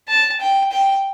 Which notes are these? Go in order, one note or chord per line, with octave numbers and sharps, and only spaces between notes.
A5
G5
G5